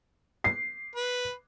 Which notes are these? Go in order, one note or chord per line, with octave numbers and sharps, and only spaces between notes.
C7
B4